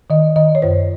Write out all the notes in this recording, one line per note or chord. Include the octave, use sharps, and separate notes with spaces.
D#3 D#5
D#3 D#5
C#5
F#2 C5